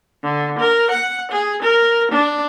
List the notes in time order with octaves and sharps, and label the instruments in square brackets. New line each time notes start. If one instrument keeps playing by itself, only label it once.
[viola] D3
A#4
F#5
G#4
A#4
D4